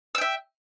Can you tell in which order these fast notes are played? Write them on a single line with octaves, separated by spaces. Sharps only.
E6 G5 E5